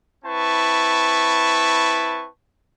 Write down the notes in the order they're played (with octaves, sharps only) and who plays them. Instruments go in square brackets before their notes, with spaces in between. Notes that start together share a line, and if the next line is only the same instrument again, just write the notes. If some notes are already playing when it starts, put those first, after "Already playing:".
[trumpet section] C4 E4 B4 A5 C#6